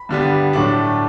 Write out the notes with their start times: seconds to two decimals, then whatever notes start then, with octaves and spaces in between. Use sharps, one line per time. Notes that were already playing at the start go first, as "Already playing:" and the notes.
Already playing: B5
0.09 G2 D3 G3 B3
0.53 A2 F#3 A3 D4